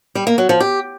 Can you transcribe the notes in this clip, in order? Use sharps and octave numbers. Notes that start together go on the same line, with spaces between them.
G3
A#3
F#3
F3
G4